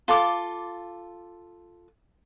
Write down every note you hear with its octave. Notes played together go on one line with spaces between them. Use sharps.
F4 A4 C6 D6